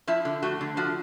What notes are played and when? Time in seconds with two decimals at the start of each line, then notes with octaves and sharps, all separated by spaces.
0.08 F3 E4
0.25 D3
0.42 A3 F#4
0.61 D3
0.77 F3 F#4